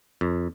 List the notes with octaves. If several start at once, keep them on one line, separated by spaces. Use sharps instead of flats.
F2